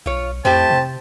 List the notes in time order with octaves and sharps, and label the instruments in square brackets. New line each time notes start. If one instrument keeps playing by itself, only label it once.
[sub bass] B1 [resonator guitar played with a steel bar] F4 C#5
[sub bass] F2 [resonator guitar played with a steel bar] A2 A3 G4 [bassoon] C4 [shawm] A5
[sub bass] C3